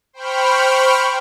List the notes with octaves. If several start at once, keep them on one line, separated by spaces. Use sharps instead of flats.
C5 G5 B5 C#6 F6